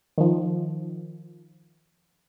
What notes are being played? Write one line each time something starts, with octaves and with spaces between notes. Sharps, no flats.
D#3 F3